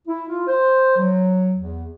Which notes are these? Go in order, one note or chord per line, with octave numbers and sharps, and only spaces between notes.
E4
F4
C5
F#3
E2